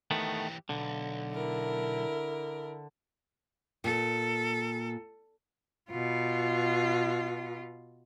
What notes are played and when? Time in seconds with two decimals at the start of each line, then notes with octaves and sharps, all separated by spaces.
0.11 D#3 E3 A3 B3 G4
0.69 B1 D3
1.33 E4 A#4
3.84 A#2 A4
5.90 B2 F4